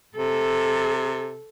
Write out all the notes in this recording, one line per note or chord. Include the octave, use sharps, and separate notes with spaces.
C3 A4